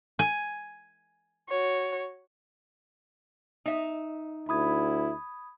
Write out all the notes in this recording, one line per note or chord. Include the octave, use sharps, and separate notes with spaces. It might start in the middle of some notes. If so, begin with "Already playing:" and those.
G#5
F#4 C#5
D#4 E5
D2 E4 B5 D#6 G#6